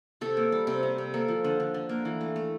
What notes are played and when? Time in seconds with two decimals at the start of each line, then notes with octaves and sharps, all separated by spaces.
0.21 C3 A4
0.37 A#3
0.52 G3
0.67 C3
0.83 C3
0.98 C3
1.14 A#3 A4
1.28 F3
1.44 D3
1.60 D3
1.74 D3
1.89 A#3
2.05 E3
2.21 A3
2.36 A3